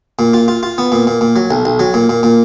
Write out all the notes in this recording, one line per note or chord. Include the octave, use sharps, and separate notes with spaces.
A#2
F4
F4
F4
B3
A#2
A#2
A#2
F#3
B1
B1
F#3
A#2
A#2
A#2